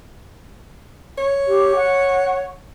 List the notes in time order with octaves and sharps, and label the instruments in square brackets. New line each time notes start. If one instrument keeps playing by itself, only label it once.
[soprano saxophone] C#5
[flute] G4
F#5